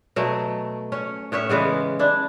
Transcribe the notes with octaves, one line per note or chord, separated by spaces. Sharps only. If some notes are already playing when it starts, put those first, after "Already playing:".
B2 F#3 A3
C#4 C#5
A2 C#4 C#5 E5
C#3 E3 G#3 B3
D4 E4